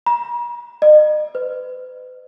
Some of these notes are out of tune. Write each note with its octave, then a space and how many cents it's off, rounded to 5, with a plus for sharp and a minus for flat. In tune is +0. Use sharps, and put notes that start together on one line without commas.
A#5 +45
D#5 -40
B4 +45